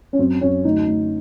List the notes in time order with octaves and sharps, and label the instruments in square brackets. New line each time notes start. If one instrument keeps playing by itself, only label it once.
[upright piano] C#4
F#2 C4
F#2 C#4
D2 D#4
D2